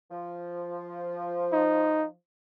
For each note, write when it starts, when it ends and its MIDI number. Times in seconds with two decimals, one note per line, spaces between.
0.11 2.12 53
1.52 2.07 63